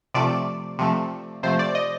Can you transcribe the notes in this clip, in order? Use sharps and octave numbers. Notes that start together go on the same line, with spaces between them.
C3 F3 A3 D5
C3 F3 A3
C3 F3 A3 C5
D5
D#5